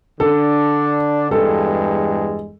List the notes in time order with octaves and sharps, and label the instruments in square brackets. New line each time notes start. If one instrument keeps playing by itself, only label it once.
[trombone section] D3 D4 [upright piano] A4
[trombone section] E2 G2 G#3 [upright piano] A4